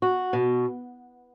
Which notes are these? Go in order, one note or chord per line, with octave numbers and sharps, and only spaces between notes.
F#4
B2